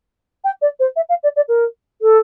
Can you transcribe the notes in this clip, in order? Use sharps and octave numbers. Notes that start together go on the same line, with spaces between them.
G5
D5
C5
E5
F5
D5
D5
A#4
A4